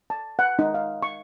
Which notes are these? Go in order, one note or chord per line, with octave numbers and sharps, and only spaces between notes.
A5
F#5
D#4
F5
C#6